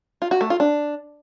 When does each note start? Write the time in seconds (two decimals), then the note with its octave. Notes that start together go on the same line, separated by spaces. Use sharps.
0.22 F4
0.31 F#4
0.41 A3
0.50 F4
0.60 D4